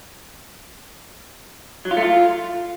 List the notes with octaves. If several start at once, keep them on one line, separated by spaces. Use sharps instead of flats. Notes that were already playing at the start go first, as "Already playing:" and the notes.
F#3
F4
A3
F4